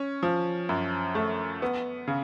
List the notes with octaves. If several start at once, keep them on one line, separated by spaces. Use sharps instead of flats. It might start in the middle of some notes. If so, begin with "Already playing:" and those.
Already playing: C#4
F3
F#2
A3
B3
C#3